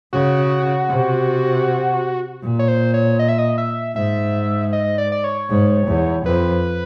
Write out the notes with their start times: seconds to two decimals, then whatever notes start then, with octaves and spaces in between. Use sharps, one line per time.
0.13 C#3 F#4
0.89 C3
2.43 A#2
2.59 C#5
2.68 C5
2.94 C#5
3.19 D#5
3.29 E5
3.38 D#5
3.58 E5
3.95 G#2 E5
4.73 D#5
4.98 D5
5.12 D5
5.24 C#5
5.50 G#2
5.87 E2
6.26 F2 B4